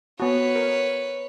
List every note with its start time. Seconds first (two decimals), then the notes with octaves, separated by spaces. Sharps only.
0.20 B3 F#4 B4 C#5
0.56 A#4